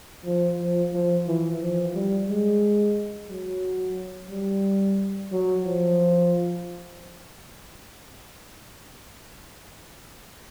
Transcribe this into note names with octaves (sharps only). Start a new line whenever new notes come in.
F3
F3
F3
E3
F3
G3
G#3
F#3
G3
F#3
F3